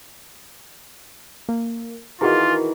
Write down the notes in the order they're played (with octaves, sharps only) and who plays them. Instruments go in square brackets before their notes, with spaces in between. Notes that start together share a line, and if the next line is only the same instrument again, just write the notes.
[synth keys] A#3
[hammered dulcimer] D#3 E3 [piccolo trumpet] F4 [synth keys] F#4 G#4 A#4